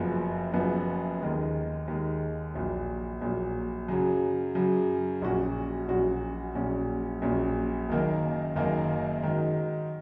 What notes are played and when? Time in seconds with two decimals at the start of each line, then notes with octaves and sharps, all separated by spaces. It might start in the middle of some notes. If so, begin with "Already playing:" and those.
Already playing: F#1 F#2 F3 B3
0.54 F#1 F#2 F3 B3
1.21 D#2 D#3 G#3
1.88 D#2 D#3 G#3
2.54 A#1 A#2 F#3
3.21 A#1 A#2 F#3
3.88 F#2 C#3 F#3
4.55 F#2 C#3 F#3
5.22 A#1 A#2 F#3 C#4 F#4
5.88 A#1 A#2 F#3 C#4 F#4
6.55 A#1 A#2 F#3 C#4
7.22 A#1 A#2 F#3 C#4
7.89 F#1 F#2 D#3 A#3
8.56 F#1 F#2 D#3 A#3
9.23 G#2 D#3 F#3